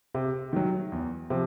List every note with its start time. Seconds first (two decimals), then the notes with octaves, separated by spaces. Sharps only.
0.14 C3
0.53 D#3 F#3
0.92 E2
1.30 C3 F3